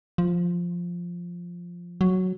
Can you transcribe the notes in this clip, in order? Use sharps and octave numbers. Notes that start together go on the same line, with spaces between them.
F3
F#3